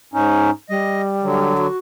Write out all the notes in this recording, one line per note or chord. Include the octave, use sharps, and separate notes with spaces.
G#2 C#4 D#4
G3 D#5
D3 F#3
F#4